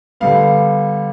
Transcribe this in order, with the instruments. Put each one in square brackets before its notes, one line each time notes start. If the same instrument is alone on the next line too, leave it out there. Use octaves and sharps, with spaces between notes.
[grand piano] D3 G3 B3 F5